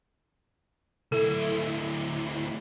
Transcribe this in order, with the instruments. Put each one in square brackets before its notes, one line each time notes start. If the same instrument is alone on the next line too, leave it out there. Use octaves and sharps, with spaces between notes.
[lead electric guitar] D2 E4 [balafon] A4